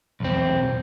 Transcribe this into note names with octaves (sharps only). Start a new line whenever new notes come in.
B1 E2 C4